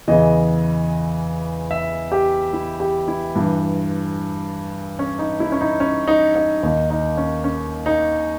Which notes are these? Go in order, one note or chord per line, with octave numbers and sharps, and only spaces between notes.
E2 C#3 E3 D#5
E5
G4
E4
G4
E4
G2 E3
C#4
D#4
E4
C#4
D#4
C#4
D#4
D#4
D#2 D#3 D#4
D#4
C#4
C#4
D#4